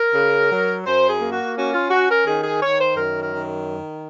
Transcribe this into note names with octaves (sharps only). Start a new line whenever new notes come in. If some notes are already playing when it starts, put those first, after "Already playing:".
Already playing: A#4
C#3
F#3
F#2 C5
G#4
A#3
F#4
C#4 F#4
F4
C#4 F#4
A#4
D#3 G#4
G#4
D#3 C#5
C5
F#2 A#4
A#4
D#3